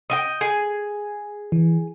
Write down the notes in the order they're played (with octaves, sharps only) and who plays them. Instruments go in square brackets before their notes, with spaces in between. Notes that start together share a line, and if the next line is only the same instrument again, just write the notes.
[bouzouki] D#5 E5 G5
G#4
[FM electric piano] E3